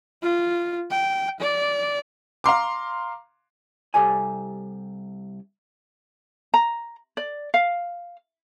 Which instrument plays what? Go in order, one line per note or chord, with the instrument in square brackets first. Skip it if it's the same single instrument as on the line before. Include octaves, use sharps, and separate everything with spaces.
[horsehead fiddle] F4
G5
D5
[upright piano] F5 A#5 C6 D6
[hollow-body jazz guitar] C2 C3 G4 A4 D5 G#5
[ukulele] A#5
D5
F5